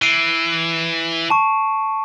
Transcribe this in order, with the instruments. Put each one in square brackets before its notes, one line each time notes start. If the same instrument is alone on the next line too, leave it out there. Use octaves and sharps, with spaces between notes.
[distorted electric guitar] E3 [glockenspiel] C7 D7 D#7
[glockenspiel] A5 C#6